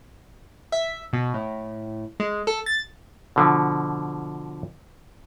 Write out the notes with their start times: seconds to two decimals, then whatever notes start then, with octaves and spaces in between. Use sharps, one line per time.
0.72 E5
1.13 B2
1.34 A2
2.20 G#3
2.47 A4
2.66 A6
3.36 B2 D3 F3